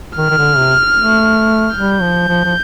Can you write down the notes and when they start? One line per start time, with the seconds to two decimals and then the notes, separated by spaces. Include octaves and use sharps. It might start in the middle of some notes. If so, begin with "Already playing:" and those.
0.17 D#3 F6
0.30 D#3
0.37 D3
0.57 C3
0.97 A3
1.75 G3 G6
2.01 F3
2.28 F3
2.45 F3